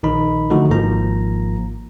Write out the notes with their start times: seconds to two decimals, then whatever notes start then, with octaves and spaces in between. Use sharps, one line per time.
0.03 A#1 D#3 D#4 B5
0.50 D3 F3 A3 D#4 F#4 A4
0.70 G#1 G#2 F3 A#3 A#5